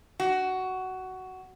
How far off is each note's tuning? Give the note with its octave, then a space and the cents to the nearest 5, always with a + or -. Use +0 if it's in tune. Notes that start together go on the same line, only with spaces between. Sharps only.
F#4 +15